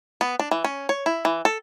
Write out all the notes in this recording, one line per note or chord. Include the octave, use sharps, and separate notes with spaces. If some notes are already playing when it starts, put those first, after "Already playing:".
B3
D4
E3
C#4
C#5
E4
E3
A4